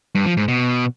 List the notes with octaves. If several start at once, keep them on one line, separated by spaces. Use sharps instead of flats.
G2
F3
G#2
B2